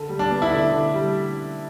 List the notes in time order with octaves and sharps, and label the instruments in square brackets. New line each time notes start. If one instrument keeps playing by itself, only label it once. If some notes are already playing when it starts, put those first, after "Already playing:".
Already playing: [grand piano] D3
G3
D4
B3
E4
D3 D4
D3
G3